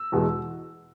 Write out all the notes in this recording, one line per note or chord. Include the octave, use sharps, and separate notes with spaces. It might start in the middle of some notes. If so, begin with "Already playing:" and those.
Already playing: E6
E2 B2 G#3